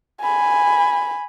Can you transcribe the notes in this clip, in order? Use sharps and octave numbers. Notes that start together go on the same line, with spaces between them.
G#5 B5